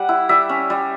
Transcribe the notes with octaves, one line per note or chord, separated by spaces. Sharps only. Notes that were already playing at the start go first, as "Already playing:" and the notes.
Already playing: G3 F#5
E4
G3 E5
C#4
G3